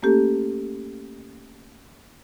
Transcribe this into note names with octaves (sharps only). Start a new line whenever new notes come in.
A3 A#3 C#4 G4 A4